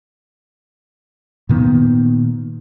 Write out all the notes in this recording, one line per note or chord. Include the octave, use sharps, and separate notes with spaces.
A#2 D#3 B3